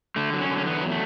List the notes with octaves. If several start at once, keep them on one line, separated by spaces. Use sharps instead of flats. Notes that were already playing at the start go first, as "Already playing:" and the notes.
D3 A3
F#3
C#4
D3
C#4
E2 B3
F#3
A3